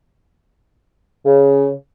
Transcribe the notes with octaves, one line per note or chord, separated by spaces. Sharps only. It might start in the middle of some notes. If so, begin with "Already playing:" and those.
C#3